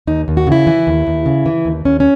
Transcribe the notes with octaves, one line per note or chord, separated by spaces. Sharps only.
D#2 D#4
D#2
F#4
C#3
E4
E3
D#2
D#2
C#3
E3
D#2
D#2 C#4
C#4